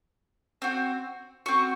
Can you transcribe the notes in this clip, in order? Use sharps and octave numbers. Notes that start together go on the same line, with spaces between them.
C4 F#4
C4 F#4 C#6